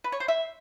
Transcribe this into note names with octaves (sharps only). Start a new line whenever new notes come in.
B4
C#5
C5
E5